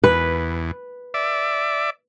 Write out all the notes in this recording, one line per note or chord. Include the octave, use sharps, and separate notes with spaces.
E2 B4
D5 E5